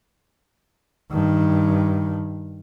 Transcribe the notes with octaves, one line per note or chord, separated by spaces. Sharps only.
G2 D#3